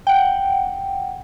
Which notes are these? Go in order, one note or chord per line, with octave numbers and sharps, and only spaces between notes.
F#5 G5